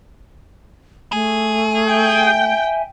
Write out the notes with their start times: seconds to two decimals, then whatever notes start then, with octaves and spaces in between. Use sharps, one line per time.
1.13 A3 G#4
1.87 E5 G5 G#5